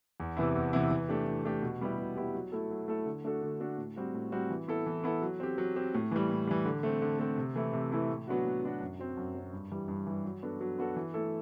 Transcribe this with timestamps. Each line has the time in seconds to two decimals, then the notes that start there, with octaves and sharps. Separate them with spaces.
0.20 E2
0.37 C3 E3 B3 E4
0.55 E2
0.73 C3 E3 B3 E4
0.91 E3
1.08 A3 D4 G4
1.27 E3
1.45 A3 D4 G4
1.62 B2
1.81 G3 B3 E4 G4
1.98 B2
2.16 G3 B3 E4 G4
2.35 F#3
2.52 A3 E4 A4
2.71 F#3
2.88 A3 E4 A4
3.06 D3
3.24 A3 D4 F#4 A4
3.43 D3
3.60 A3 D4 F#4 A4
3.78 A2
3.96 G3 C4 F#4
4.14 A2
4.32 G3 C4 F#4
4.50 E3
4.68 B3 E4 A4
4.86 E3
5.04 B3 E4 A4
5.22 F#3
5.40 C4 G4
5.58 F#3
5.76 C4 G4
5.94 A2
6.11 E3 G3
6.30 A2
6.47 E3 G3
6.65 D3
6.83 A3 C4
7.02 D3
7.19 A3 C4
7.38 C3
7.56 E3 A3 E4
7.73 C3
7.92 E3 A3 E4
8.09 A2
8.28 F#3 B3 D4 F#4
8.45 A2
8.63 F#3 B3 D4 F#4
8.81 F#2
9.00 F#3 C4
9.17 F#2
9.35 F#3 C4
9.53 G2
9.71 E3 G3
9.88 G2
10.06 E3 G3
10.25 F#3
10.43 B3 D4 F#4 A4
10.61 F#3
10.78 B3 D4 F#4 A4
10.96 E3
11.14 A3 E4 A4